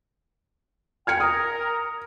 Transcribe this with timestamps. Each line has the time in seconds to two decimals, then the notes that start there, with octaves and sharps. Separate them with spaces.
1.07 G5 F6 G#6 C#7
1.20 A#4 D#6